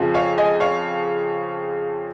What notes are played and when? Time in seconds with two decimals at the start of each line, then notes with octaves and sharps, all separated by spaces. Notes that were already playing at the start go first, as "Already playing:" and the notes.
Already playing: F2 C#3 F3
0.14 C#5 F5
0.38 D#5 G#5
0.60 C#5 F5